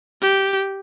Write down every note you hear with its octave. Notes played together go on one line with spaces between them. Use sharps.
G4